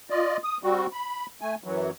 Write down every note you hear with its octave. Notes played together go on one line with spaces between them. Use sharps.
F4 D5 D#5
D#6
G3 C4 F#4
B5
A3 G#5
F#2 E3 F#3